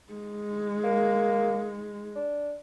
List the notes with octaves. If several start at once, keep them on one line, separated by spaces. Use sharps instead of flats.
G#3
A#3
D4